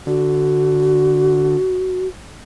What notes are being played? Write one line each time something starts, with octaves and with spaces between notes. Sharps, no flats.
D3 F#4